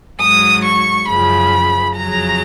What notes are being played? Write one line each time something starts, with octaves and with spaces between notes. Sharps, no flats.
G#2 F#3 D#6
C#6
F#2 C#3 F3 B5
F2 C#3 F#3 A#5